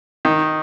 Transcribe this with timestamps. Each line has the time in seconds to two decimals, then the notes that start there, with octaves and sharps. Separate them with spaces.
0.25 D#3